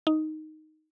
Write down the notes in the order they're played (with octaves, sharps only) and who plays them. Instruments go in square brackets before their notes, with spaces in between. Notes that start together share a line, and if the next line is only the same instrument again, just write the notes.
[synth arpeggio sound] D#4